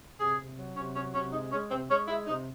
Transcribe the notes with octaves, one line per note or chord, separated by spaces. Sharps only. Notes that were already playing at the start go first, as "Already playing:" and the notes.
C3 G#4
C3
F#3
C3 C#4
F#3 C#4
C3 C#4
G#3 D#4
G#3 C#4
C3 C4
G#3 C#4
G#3 E4
C3 D#4